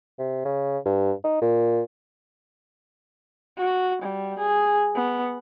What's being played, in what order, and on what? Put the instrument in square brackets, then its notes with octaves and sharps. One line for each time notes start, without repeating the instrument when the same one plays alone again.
[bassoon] C3
C#3
G2
D#4
A#2
[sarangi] F#4
G3
G#4
B3